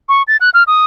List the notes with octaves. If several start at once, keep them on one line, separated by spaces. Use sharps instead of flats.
C#6
A6
F#6
F6
D#6